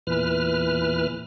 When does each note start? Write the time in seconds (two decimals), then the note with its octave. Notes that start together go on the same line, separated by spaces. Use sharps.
0.07 E2 A#2 E3 B4 F6